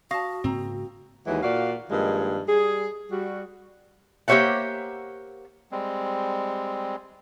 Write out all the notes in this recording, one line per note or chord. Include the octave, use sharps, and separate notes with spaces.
F#4 F5 A5 C#6 D#6 A#6
G#2 C#3 A#3 C4 A#5
D#2 E3 F#3 G#3 D#4
A#2 F#4 D5 F5
G2 D#3 F3 G#3 A#3
G3 G#4
G3 F#4
A#3 G4 C5 C#5 E5 F#5
G3 G#3 C4